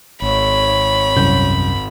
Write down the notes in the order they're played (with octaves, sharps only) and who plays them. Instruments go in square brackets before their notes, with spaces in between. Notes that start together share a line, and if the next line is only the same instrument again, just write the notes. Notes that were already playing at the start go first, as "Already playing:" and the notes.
[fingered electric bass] G#1 [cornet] C#5 [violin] B5
[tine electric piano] C2 F#2 G6